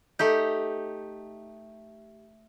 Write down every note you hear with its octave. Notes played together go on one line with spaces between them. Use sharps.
A3 D#4 G4